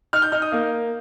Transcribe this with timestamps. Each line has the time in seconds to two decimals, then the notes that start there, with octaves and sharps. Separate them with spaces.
0.13 D#4 F6
0.22 G6
0.32 D#4 F6
0.42 D#6
0.52 A#3